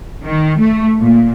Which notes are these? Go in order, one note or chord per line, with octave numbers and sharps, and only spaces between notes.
D#3
A3
A#2